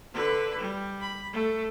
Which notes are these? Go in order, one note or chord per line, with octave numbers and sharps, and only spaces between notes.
D3 B4
G3
B5
A3